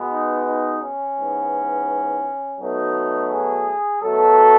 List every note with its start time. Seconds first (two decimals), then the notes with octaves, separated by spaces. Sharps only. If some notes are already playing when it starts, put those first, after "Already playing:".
Already playing: B2 G#3 B3
0.10 D#4
0.46 D#4
0.81 C#4
1.17 G#2 E3 B3
2.59 B2 F#3 A3 D#4
3.31 G#4
4.02 B2 F#3 A3 A4